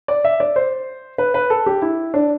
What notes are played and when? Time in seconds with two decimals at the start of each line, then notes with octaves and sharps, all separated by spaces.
0.08 D5
0.25 E5
0.40 D5
0.56 C5
1.18 B4
1.34 B4
1.50 A4
1.66 G4
1.82 E4
2.14 D4